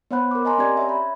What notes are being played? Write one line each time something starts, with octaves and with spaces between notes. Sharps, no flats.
B3 C5 C#5 F#5 B5 F#6
A#4 D6
D#5 G#5 A#5 C6
C4 C#4 G4 D5 A#5 G#6
C#5 E5
B5